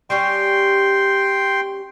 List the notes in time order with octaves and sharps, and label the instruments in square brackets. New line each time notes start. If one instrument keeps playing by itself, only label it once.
[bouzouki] G3 C#4 G4 [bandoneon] G5 C6